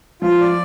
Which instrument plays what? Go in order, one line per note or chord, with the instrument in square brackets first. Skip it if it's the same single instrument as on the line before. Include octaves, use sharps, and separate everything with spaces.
[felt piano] F3 [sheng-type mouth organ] F4
[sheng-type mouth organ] D5